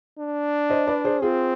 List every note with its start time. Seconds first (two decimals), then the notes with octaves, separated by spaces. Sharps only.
0.19 D4
0.70 C5 D#5
0.87 B4 D5
1.04 G#4 C5
1.22 C4 F4 G#4